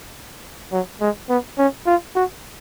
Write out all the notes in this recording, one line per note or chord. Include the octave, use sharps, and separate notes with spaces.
F#3
G#3
B3
C#4
F4
F#4